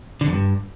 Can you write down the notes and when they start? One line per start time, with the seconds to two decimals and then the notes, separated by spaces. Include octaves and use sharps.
0.21 D3
0.27 F2
0.33 G2